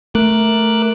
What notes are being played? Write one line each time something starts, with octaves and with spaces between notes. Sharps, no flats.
A3 A#4 D6 F#6